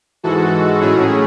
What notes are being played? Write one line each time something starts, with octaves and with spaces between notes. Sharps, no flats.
G#2 E3 G#3 F#4 A4
A2 F#3 A3 C#4 E4 G#4